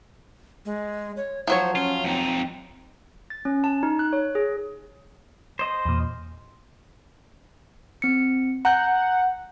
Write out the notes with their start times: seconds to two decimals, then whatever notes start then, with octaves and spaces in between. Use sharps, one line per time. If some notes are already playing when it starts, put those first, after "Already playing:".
0.65 G#3
1.17 C#5
1.47 F3 F#3 C5 C#5
1.75 C#4 F4
2.04 F2 C4 D#4
3.30 A6
3.45 C#4
3.64 A5
3.83 D#4
3.99 F#6
4.13 C#5
4.35 G#4
5.59 C5 D#5
5.85 E2 A#2
8.02 C4 C#7
8.65 F#5 A#5 G6